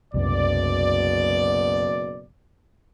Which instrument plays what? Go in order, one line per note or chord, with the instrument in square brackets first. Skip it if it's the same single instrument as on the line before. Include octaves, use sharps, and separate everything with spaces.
[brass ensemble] F#1 B2 D5 [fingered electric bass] C2 F#2